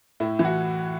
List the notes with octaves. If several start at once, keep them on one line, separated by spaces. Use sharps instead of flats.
A2 E4
E3
F#4